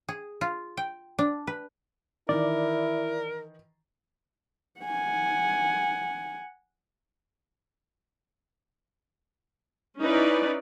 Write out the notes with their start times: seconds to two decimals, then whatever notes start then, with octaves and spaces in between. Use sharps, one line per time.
0.08 G#4
0.41 F4
0.77 G5
1.19 D4
1.47 B4
2.29 D#3 E3 E4 A#4 D5
4.80 F#5 G#5
9.99 C#4 D#4 E4 B4 D5